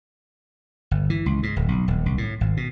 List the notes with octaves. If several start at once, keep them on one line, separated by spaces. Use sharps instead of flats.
G1
E3
C#2
G#2
D1
B1
D#1
C2
A2
G#1
B2